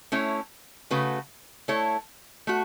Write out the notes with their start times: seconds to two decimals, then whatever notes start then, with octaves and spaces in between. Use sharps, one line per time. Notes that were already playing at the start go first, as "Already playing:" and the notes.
0.12 A3 C#4 E4 C#5
0.91 C#3 A3 F#4 B4
1.68 A3 E4 A4 C#5
2.47 A3 F#4